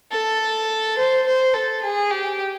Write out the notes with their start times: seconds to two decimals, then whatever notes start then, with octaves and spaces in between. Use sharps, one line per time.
0.12 A4
0.98 C5
1.26 C5
1.54 A4
1.82 G#4
2.11 G4